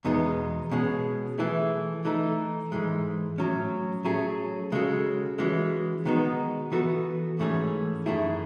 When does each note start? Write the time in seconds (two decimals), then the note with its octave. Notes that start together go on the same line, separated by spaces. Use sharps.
0.05 E2 B2 G#3 B3 D#4
0.71 B2 G#3 C#4 G#4
1.38 E3 A3 E4 G#4
2.05 E3 A3 D#4 A4
2.72 G#2 E3 G#3
3.38 A2 F#3 C#4
4.05 F#3 A3 C#4 G#4
4.72 C#3 G#3 C#4 F#4 A4
5.38 E3 G#3 C#4 F#4
6.05 D#3 G#3 B3 D#4 F#4
6.72 E3 B3 F#4 A4
7.39 G#2 E3 A3 C#4 G#4
8.06 F#2 D#3 A3 E4 G#4